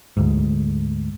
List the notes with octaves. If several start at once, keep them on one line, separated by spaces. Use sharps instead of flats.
D2 G#2